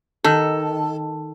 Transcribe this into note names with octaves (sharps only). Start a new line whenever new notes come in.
D#3 A4